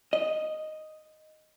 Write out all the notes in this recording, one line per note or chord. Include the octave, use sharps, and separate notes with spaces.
D#5